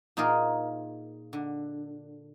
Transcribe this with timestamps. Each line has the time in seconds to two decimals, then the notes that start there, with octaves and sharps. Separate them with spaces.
0.17 A#2 D#4 F4 G#4 A#4
1.33 D3